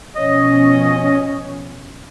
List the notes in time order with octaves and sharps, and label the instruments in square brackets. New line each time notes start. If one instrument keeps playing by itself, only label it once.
[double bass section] B2 F3 C#4 [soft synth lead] C#5 [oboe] D#5